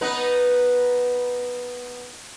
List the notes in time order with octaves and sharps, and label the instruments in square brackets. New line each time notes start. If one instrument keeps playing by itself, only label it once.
[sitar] B3 D#4 B4